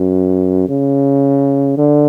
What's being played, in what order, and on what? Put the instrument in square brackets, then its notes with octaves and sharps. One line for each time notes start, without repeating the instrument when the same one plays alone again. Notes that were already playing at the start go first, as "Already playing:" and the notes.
Already playing: [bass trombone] F#2
C#3
D3